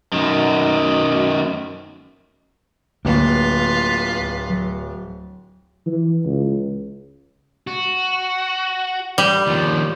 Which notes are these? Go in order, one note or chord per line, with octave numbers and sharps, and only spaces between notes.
F#2 D#3
D1 D2 D3 A#3 F4 B4
F#3
E3
C#2
F#4
G3
D#2 F3